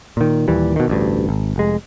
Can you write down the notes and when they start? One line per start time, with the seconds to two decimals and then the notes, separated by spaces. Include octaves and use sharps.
0.17 A#2 D#3
0.48 D#2 A#2 E3 G3
0.76 B2 D#3
0.88 A1 D2 G2
1.29 G#1
1.56 F1 G#3